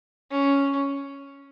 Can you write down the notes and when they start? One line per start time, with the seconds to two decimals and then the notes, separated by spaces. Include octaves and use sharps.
0.31 C#4